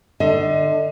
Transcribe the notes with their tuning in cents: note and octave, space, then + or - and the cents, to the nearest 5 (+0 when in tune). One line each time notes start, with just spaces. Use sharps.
D3 +25 D#5 +40